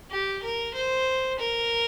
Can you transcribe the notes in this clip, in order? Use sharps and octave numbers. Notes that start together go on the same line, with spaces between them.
G4
A#4
C5
A#4